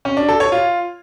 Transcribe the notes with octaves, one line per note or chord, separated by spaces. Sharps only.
C#4
D4
A4
C#5
F4